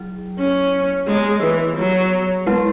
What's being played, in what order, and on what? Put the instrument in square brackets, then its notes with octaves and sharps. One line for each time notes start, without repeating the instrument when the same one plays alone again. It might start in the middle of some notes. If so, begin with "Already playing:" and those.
Already playing: [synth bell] F#3 E4 G#4
[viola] C#4
[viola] G#3 [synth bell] B3 G#4 C#5
[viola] E3
F#3
[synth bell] G#3 B3 E4 B4